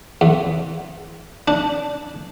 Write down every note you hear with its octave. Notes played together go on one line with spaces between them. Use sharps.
E2
D4